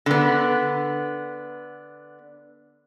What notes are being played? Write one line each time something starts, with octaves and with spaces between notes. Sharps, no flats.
D3 B3